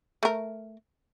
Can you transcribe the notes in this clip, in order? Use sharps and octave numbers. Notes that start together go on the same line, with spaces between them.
A3 A#4